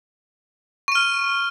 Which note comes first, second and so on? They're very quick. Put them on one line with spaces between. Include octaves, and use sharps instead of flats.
C#6 D#7 F6